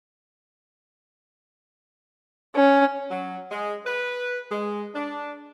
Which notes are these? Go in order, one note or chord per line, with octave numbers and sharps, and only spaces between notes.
C#4
F#3
G#3
B4
G#3
D4